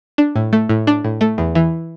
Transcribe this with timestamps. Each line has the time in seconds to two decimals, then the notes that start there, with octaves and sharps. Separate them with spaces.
0.18 D4
0.36 A2
0.53 A3
0.69 A2
0.87 D4
1.04 A2
1.21 A3
1.38 E2
1.55 E3